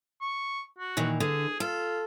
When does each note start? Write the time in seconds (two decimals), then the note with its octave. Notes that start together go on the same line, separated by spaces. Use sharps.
0.21 C#6
0.78 F#4
0.97 A#2 D#3 E3
1.20 D3 G#4
1.60 F4 A4